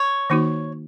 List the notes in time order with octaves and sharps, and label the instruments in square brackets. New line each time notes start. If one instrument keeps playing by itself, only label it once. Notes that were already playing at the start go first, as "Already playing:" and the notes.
Already playing: [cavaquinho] C#5
[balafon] D#3 A#3 D#4 F#4